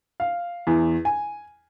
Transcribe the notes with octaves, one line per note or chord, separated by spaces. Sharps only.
F5
E2
G#5